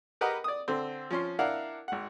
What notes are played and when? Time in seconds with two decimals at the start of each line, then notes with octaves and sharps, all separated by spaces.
0.21 G4 A#4 B4 D#5 F#5
0.44 D5 D#6
0.68 D3 C4
1.10 F3 C#4 C6
1.39 D4 E4 A#4 F5 F#5
1.88 G#1 F#5